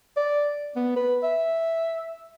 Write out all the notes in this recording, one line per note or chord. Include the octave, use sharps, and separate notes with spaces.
D5
B3
B4
E5